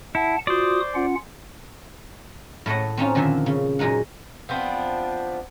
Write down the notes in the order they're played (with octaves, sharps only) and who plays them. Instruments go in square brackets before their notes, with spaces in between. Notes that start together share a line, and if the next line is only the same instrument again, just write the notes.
[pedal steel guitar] E4 [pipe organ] F#5 A5
[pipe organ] F4 F#4 D#6 [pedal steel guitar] C5 D5
[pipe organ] C#4 F4 F#5
[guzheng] A2 A3 E4 D#5 F#5
C4 C#4 D#4 F4
A#2 D3 D#3 F3 C5 E5
C#3
F#2 A#2 G#3 D#4 F#5
[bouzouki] F3 B3 C4 D4